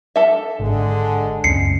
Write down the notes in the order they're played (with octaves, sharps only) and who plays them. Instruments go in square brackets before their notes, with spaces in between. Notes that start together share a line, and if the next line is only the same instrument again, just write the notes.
[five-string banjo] A4 E5
[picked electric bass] G#1 [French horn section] D3 G#3
[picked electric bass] C#2 F#2 C#4 [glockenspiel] C7 C#7